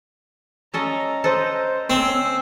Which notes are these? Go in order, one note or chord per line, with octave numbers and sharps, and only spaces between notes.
C#4 A4 D#5 A#5
A4 B4 C5 D#5
C4 C#4 E6